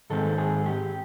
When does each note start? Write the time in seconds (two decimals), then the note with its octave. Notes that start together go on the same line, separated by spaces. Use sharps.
0.10 G#2 D#3 G#3 C4 A4
0.38 G#4
0.66 G4